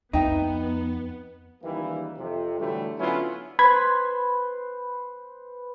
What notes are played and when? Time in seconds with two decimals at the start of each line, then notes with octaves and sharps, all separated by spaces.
0.13 F2 B3 D#4 E5 G5 A#5
1.63 C#2 D#3 E3 G3 A#3 E4
2.18 F2 C3
2.59 A2 D3 E3 F#3 G3 A3
2.99 D3 F#3 B3 C#4 E4 F4
3.59 B4 C5 B5 G#6